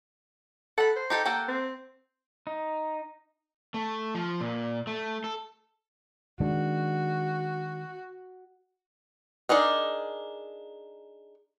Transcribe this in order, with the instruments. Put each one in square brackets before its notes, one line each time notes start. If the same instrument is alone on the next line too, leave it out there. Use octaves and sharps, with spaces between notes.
[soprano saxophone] A4 [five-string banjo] F#5 B5
[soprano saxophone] C5
[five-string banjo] D#4 G4 A4
[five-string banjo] A#3 A4 F#5 [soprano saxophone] G5
[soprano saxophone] C4
[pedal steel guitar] D#4
[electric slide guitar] A3
F3
A#2
A3
A4
[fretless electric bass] D#3 G#3 D4 [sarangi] F#4
[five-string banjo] D4 D#4 G#4 A#4